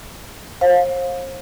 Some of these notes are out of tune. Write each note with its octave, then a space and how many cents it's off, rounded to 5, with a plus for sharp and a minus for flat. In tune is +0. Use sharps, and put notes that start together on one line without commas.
C5 +40 F5 +20